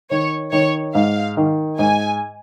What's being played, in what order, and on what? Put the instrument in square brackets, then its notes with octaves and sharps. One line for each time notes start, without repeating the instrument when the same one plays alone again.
[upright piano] D#3 [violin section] C#5
[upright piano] D#3 [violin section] C#5
[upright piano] G#2 [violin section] F5
[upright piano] D#3
[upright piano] G#2 [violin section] G#5